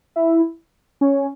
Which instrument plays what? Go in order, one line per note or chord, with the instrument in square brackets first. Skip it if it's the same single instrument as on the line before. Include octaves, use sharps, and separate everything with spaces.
[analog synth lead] E4
C#4